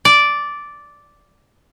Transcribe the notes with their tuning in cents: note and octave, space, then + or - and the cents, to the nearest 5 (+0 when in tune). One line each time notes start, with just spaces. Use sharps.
D5 -5